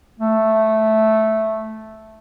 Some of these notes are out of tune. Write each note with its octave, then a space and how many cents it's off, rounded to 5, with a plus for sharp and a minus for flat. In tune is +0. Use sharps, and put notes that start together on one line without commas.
A3 -5